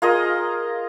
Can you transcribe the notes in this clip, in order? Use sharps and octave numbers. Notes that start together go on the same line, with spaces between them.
F4 G#4 A#4 D#5